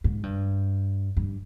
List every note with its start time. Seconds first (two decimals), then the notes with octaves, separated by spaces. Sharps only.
0.04 G#2
0.23 G2
1.17 G2